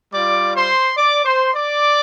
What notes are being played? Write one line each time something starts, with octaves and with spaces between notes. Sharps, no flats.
G3 F4 D5 D6
C5 C6
D5 D6
C5 C6
D5 D6